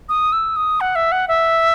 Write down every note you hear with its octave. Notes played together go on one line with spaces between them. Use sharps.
D#6
E6
D#6
F#5
E5
F#5
E5